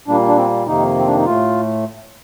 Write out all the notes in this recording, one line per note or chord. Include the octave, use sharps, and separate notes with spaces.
A#2 G3 A#3 D4
D4
C4
F2 C3 D#3 A#3 D#4
C4
D4
D#4
A2 A3 F4